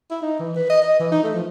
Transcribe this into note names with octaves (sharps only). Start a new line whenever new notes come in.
E4
D#4
E3
B4
D#5
D#5
E3
D#4
A3
F3